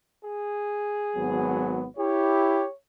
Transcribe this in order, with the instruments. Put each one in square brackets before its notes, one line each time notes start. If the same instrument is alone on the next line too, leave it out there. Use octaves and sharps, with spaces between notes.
[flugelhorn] G#4
[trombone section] G#1 F#3 B3
[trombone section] E4 G4 [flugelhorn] C#5